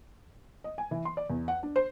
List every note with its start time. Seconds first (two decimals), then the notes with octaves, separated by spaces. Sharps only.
0.64 D#5
0.78 G#5
0.91 E3
1.05 C6
1.17 D5
1.30 E2
1.48 F#5
1.63 D4
1.76 C5